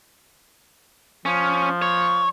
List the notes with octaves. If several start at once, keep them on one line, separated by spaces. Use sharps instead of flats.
F3 C#4
C#5